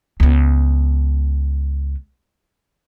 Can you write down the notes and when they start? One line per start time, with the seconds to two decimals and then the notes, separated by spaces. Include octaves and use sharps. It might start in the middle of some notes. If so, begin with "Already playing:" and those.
0.20 C#2 B3